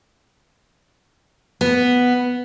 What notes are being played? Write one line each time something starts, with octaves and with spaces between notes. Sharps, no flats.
B3